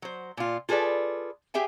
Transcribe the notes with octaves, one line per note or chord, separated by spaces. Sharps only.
F#3 C5
A#2 F4
F4 G#4 A4 B4 D5
G4 G#4 E5 G5 G#5